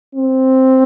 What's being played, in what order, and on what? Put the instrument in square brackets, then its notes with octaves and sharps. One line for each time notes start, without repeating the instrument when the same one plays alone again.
[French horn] C4